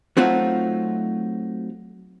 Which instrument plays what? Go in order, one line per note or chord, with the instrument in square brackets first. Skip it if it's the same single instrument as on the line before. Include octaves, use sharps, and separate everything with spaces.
[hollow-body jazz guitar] F#3 A3 C4 D#4 F4 F#4